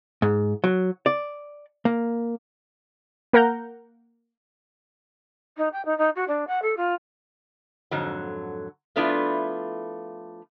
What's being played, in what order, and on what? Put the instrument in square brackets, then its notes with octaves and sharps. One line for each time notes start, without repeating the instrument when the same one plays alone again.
[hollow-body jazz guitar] G#2
F#3
D5
A#3
[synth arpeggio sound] A#3 A#4 F#5 A#5 G6
[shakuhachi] D#4
G5
D#4
D#4
F#4
D4
F#5
A4
F4
[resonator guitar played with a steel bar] F2 G#2 D3 F#3
F3 A3 B3 D4 E4 F4